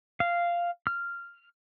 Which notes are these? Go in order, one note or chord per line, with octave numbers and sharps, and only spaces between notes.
F5
F6